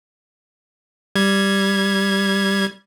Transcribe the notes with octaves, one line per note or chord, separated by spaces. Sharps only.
G3 G#6